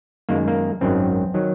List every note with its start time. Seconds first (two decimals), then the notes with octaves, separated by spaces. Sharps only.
0.29 F#2 D#3 G#3 A#3
0.48 A#3
0.81 G#1 F#2 D#3 F#3 C4
1.34 D#3 F#3